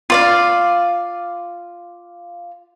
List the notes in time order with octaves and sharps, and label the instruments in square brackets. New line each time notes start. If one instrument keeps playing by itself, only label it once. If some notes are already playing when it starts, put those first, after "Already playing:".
[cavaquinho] F4 D5 F5